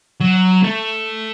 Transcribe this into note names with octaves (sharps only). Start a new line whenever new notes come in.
F#3
A3